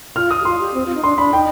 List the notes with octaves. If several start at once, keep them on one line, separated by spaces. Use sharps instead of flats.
F4 F6
D#6
G4
F4 C6
G4
C4
F4
D#4
D4 C6
D4 B5
D#4 G5